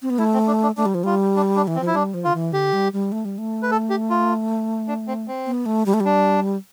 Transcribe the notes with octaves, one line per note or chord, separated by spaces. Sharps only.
C4
B3
A3 E4
C4
D4
D4
A3 D4
G3
F3
G3 F4
D4
D4
E3
C4
F3
E4
G3 D4
F3
D3 F4
E3
D3 G4
G3
G3
A3
G3
A3
B4
A4
G4
F4
D4
C4
C4
B3
A3
G3
A3
G3 D4